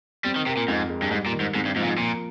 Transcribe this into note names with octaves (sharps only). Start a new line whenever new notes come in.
G3 C4
D#3
C3 A#4
A#2
F2 G#2
G#3
G2
G#2 G3
A#2
D#3
G#2
G#2 C4
G2
G#2 F3
A#2
G#2
A#2 A#3